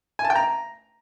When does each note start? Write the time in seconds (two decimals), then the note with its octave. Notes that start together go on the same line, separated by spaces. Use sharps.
0.19 G#5
0.25 A5
0.30 G5
0.35 A#5